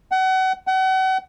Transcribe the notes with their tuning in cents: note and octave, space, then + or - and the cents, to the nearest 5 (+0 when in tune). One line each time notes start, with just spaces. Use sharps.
F#5 +30
F#5 +35